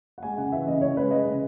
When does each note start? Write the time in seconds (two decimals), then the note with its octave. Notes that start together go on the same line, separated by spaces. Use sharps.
0.18 F#5
0.23 G#3 G#5
0.38 C#3 F#5
0.52 E3 E5
0.67 C#3 D#5
0.81 C#3 C#5
0.97 G#3 B4
1.11 G#3 D#5
1.25 C#3